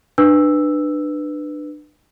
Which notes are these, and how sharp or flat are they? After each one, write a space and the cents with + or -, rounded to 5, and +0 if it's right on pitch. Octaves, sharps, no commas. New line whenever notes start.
D4 +25 B4 +0 E6 +0